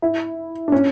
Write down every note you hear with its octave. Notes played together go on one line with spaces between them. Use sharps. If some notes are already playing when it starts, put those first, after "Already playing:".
E4
D4
C#4